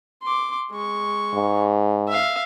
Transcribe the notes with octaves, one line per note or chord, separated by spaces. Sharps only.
C6 D6
G#3 C#6
G#2
E5 F5